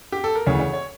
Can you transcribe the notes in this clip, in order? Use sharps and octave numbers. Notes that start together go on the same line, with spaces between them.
G4
A4
A#4
D2 C#3 E3 C#5
C#5
C#5